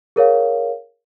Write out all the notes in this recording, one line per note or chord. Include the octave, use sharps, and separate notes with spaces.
G#4 A#4 C#5 F5